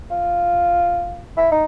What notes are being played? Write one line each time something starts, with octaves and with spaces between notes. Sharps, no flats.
F4
E4
D#4